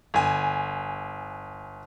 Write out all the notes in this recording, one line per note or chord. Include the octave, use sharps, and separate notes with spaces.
G1 G#5